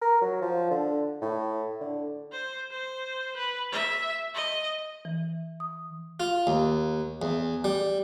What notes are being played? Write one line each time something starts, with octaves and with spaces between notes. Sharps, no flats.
A#4
F#3
F3
D3
A2
D3
C5
C5
B4
E5
D#5
E3
D#6
F4
D#2
E2
G3